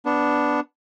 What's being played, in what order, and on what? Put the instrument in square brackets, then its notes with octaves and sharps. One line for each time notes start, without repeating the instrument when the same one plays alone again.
[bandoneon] B3 D4